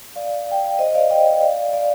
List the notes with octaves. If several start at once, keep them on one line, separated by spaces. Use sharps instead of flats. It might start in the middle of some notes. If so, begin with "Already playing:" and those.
D5 F5
G5
F5
C5 D#5
D5 F5
D#5 G5
D5 F5
D5 F5